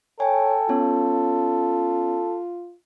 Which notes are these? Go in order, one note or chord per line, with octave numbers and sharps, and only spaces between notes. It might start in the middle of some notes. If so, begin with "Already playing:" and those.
A4 C#5 G5 G#5
B3 C#4 F4 C#5